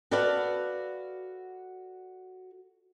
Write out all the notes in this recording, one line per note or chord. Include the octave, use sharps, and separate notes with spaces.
F#4 A4 B4 D5 F5 F#5